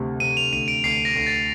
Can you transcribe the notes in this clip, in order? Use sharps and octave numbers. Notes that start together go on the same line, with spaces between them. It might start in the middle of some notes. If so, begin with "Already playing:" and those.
Already playing: D2 C3
C3 D#7
F7
D2 D#7
D7
D2 C7
A#6
D2
A6